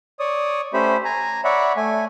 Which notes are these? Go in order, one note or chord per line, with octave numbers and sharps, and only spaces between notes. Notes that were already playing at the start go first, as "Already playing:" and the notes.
C#5 D5 D#6
A3 C#4 G4 C5 B5
G#5 A#5
C#5 D5 E5 F#5 B5
A3 G#5